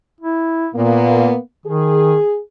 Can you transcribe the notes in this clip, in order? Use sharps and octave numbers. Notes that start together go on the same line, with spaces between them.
E4
A#2 A#3 B3
D#3 G#4